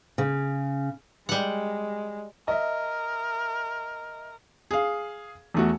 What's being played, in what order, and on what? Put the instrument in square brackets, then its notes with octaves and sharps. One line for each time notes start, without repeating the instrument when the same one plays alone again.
[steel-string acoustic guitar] C#3
[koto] G3 F#5 [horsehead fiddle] G#3
[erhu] A#4 [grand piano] D#5 E5
[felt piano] G#4 F5
E2 A3 F#4